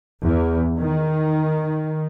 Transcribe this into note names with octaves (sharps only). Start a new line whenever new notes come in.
E2
D#3